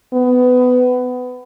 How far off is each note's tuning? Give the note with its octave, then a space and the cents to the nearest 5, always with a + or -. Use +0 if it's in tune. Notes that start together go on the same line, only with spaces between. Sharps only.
B3 +20